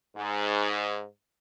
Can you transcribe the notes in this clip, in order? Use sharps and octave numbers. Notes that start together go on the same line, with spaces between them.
G#2